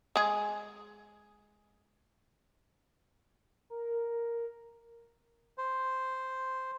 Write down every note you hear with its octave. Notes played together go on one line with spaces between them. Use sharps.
G#3 G#4
A#4
C5